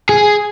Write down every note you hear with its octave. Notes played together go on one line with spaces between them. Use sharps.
G#4